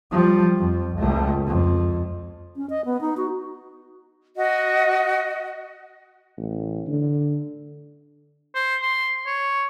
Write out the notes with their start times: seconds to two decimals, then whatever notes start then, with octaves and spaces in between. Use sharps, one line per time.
0.11 F3 G3
0.58 F2
0.95 C#2 A3
1.47 F2
2.56 C#4
2.70 D#5
2.85 B3
3.01 D#4
3.17 F#4
4.36 F#4 D#5
6.37 A1
6.87 D3
8.55 C5
8.82 C6
9.27 C#5